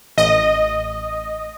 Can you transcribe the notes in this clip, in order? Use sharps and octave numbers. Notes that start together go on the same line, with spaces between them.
A1 D#5